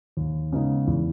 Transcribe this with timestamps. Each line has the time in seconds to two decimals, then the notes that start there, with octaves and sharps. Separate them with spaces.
0.17 D#2
0.52 C#3 G#3 B3 D#4
0.87 E2